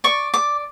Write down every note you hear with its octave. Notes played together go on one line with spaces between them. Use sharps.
D5 C#6
D5 D6